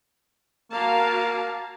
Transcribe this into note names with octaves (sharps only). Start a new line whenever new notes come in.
A#3 F#4 F5 A5